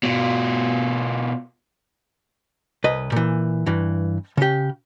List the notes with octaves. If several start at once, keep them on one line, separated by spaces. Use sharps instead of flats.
B2 F4
C2 B4 D#5
A#2 E3
G2 E3
C#3 G4